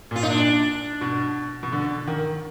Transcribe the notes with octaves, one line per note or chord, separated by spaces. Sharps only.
A#2 F4
D#4
D4
B2
B2
D3
D#3